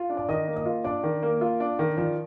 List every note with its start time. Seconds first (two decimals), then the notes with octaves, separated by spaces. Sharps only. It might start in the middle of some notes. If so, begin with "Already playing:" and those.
Already playing: F4
0.10 D4
0.17 D5
0.29 D#3 D#5
0.47 A#3
0.56 D#5
0.66 F4
0.84 D4 D5
1.03 D#3
1.23 A#3
1.41 F4
1.60 D4
1.79 D#3
1.97 F3 D5